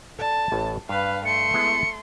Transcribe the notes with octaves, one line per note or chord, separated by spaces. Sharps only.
A4 D5 A5
A1 A2
G2 B4 F5
A3 C6 C#7
G#3 B3 E4